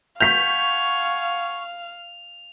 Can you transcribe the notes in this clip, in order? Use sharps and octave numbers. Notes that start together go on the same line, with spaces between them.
F5 F#5 G#5 C#6 G6 B6 F7